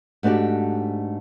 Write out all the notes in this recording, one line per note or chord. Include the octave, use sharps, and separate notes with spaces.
G#2 A3 D4 F#4 G4